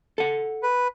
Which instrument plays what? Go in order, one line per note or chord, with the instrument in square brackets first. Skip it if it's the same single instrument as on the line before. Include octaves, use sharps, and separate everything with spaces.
[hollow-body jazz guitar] A4 F#5
[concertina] B4